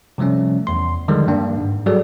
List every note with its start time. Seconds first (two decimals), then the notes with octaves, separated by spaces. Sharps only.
0.18 C3 F3 G3 A3 C#4
0.67 E2 C6
1.08 D3 D#3 F3 G3 G#3
1.28 G2 A#3 D4
1.57 G#2
1.86 F#3 G3 F#4 G#4 A4 D5